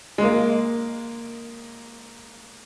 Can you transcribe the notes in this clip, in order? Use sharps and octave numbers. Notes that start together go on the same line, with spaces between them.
G#3
A#3